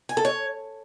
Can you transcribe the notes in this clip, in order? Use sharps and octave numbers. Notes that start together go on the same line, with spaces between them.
G#5
A4
C#5